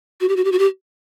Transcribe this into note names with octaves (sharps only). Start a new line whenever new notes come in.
F#4
G4
F#4
G4
F#4
G4